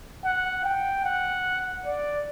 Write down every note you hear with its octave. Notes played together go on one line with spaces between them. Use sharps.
F#5
G5
F#5
D5